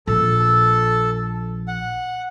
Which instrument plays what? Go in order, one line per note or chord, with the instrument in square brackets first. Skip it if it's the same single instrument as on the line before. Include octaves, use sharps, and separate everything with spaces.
[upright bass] A#1 [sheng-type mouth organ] A4 A5
[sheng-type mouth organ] F#5